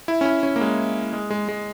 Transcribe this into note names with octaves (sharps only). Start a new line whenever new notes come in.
E4
C#4
E4
C#4
A#3
G#3
G#3
G#3
G#3